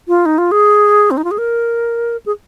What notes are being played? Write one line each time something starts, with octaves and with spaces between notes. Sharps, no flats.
F4
D#4
F4
G#4
C4
D#4
F4
G#4
A#4
G#4